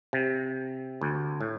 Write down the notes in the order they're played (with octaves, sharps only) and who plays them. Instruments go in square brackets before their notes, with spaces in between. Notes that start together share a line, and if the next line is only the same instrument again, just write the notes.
[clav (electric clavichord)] C3
D2
A2